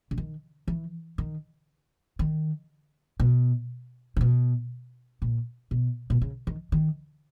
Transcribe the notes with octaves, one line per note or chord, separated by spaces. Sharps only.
C#3
D#3
E3
D#3
D#3
B2
C#3
B2
A#2
B2
B2
C#3
D#3
D#3